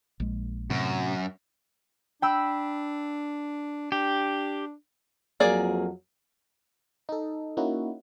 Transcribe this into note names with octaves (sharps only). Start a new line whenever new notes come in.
A#1 G#3
F#2 A2 C3
D4 G5 B5 E6
D4 G4
F2 F#3 A#3 G#4 D5
D#4 A4
A#3 C#4 D#4 E4 F#4